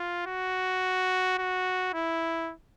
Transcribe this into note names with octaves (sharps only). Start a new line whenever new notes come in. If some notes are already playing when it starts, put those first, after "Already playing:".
Already playing: F4
F#4
F#4
E4